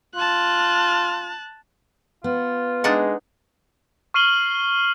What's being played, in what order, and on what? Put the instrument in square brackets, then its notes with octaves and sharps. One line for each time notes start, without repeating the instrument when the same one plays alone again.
[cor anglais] F4 [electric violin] A5 F#6
[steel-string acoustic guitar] B3 [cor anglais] F4
[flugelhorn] G#3 [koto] D4 D#4 F#5
[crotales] C#6 F6 C7 D#7 F#7 G7